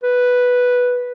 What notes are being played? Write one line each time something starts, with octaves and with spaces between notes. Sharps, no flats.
B4